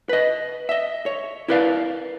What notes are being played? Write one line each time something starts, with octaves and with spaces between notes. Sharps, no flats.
B4 D#5
D#5 E5
C#5
E4 A#4 B4 D5 F5